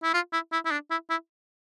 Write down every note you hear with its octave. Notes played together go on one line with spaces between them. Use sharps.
E4
F4
E4
E4
E4
D4
E4
E4